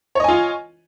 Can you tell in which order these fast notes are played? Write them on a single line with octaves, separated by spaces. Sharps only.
C#5 D#5 G#5 F4